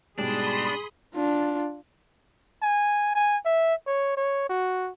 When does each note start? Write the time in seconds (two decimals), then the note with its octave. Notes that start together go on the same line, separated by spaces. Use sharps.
0.18 G#2 B2 G3 D4 G#4 B5 C6 D#6
1.15 D4 F4
2.62 G#5
3.15 G#5
3.45 E5
3.87 C#5
4.17 C#5
4.50 F#4